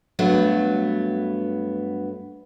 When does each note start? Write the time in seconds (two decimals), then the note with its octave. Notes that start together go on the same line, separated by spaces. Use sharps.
0.19 G2 F#3 A3 B3